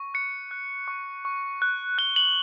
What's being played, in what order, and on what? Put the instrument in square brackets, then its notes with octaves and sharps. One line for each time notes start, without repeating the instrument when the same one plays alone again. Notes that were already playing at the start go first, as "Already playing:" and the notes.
Already playing: [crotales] C#6
F#6 C#7
F#6
C#6
C#6
F#6
F#6 G7
F#7